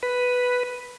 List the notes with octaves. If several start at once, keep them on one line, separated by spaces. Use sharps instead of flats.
B4